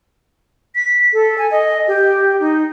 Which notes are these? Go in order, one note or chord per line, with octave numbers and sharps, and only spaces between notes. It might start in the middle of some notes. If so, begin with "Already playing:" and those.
B6
A4
G#5
D#5
G4
D#4